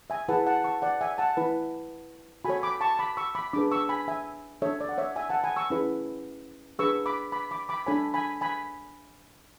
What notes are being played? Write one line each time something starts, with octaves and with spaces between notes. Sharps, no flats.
E5 G#5
E4 G#4 B4 F#5 A5
F#5 A5
A5 C#6
D5 F#5
E5 G#5
F#5 A5
E4 B4
F#4 A4 C#5 G#5 B5
B5 D6
A5 C#6
B5 D6
C#6 E6
B5 D6
D4 G#4 B4 B5 D6
C#6 E6
G#5 B5
E5 G#5
D4 A4 C#5 E5
D5
F#5
C#5 E5
E5 G#5
F#5 A5
G#5 B5
C#6 E6
C#4 E4 G#4 B4
D4 G#4 B4 C#6 E6
B5 D6
B5 D6
B5 D6
B5 D6
D4 A4 C#5 G#5 B5
G#5 B5
G#5 B5